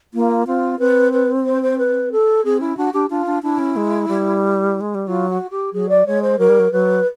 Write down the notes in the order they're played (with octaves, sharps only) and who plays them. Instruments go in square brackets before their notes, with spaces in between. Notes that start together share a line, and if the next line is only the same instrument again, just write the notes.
[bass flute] A#3 [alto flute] F4
[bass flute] C4 [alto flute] F4
[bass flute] C4 [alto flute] B4
[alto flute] B4
C5
C5
B4
A4
[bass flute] C4 [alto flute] G#4
[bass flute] C#4 [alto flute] E4
[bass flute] D4 [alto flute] F#4
[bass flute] D4 [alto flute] G4
[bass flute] D4 [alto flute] F4
[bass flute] D4
[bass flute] D4 [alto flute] E4
[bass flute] C#4
G#3
G3
G#3
G3
[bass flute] F#3 [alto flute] F4
[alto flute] F#4
G4
[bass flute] F#3 [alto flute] G#4
[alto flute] D5
[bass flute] G#3 [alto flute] C#5
[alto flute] C5
[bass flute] F#3 [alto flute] A#4
[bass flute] G3
F#3
[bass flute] F#3 [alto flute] B4